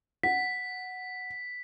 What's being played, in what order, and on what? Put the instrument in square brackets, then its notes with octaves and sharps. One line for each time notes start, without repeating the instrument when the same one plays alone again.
[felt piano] F#5 [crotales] B6